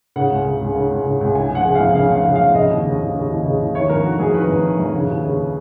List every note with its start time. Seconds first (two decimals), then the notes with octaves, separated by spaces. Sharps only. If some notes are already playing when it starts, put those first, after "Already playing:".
0.16 C#3 F#5
0.31 C#2
0.46 C#3
0.61 C#2
0.75 C#3
0.91 C#2
1.06 C#3
1.21 C#2
1.35 C#3 G#5
1.50 F2 F#5
1.65 C#3
1.75 F5
1.80 F2
1.95 C#3 F5
2.10 F2
2.15 F5
2.25 C#3
2.35 F2 F5
2.55 C#3 D#5
2.70 D#2
2.85 C#3
3.00 D#2
3.15 C#3
3.30 D#2
3.45 C#3
3.60 D#2
3.74 D#3 C#5
3.89 F2 A#4
4.04 D#3 F#4
4.20 F2 G#4
4.34 D#3 B4
4.49 F2
4.64 D#3
4.79 F2
4.95 C#3
5.09 D#2
5.24 C#3